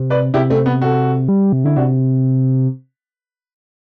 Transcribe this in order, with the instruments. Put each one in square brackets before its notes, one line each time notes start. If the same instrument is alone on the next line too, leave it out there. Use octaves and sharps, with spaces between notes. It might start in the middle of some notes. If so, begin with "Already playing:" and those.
Already playing: [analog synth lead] C3
[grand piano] B4 D5
[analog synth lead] C3 [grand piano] E4 G4
[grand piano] A3 C4
B3
F#4 A4
[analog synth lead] G3
C3
[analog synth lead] D3 [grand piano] E4
[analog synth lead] C3 [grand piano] D4 F#4